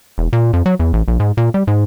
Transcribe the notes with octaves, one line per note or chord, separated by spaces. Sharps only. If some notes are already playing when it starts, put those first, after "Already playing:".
E1
A#2
F2
F#3
E2
A1
A#1
G#2
A#2
G3
G#2